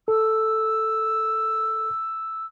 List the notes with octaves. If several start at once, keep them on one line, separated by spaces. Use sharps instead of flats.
A4 E6